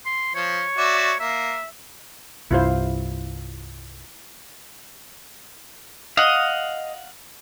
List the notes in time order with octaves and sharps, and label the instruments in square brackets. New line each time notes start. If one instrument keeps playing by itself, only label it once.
[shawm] C6
[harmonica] F3 [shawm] C#5
[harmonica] F#4 D5 E5
[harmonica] A#3 [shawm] E5
[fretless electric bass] C2 G2 [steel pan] E4 F4 C5
[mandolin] D#5 [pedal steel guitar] F5 F#5